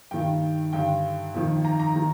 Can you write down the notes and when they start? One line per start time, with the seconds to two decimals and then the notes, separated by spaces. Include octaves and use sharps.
0.11 G2 D#3 G5
0.73 G2 D3 G5
1.34 F2 D#3
1.65 A#5
1.80 A#5
1.96 D#3